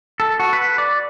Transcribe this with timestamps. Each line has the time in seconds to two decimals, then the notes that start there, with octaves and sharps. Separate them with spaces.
0.20 A4
0.40 F#4
0.53 B4
0.78 D5